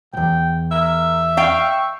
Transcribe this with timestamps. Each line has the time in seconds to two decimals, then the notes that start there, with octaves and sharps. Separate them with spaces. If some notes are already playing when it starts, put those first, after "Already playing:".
0.13 B1 E2 G5
0.71 A#4 E5
1.37 F5 G5 C#6